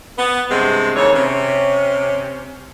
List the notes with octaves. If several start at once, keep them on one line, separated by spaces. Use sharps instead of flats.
B3
G2 C3 G#3 B3 C4
D#2 C#3 E3 C#5
C3 C#4